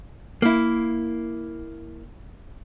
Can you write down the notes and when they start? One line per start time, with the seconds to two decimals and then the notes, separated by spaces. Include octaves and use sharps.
0.42 A#3 E4